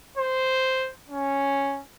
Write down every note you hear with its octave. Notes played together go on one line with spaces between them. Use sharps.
C5
C#4